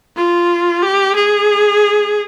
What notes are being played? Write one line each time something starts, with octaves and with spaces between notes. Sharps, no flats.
F4
G4
G#4